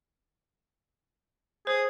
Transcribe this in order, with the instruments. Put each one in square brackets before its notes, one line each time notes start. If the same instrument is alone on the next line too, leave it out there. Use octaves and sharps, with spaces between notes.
[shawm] G#4 [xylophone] C5